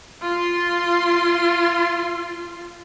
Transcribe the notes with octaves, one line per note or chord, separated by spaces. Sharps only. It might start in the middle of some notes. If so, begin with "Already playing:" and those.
F4 C6